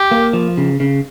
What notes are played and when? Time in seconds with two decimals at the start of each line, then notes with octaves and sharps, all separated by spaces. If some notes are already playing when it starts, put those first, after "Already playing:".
Already playing: G4
0.11 A#3
0.33 F3
0.57 C#3
0.80 C#3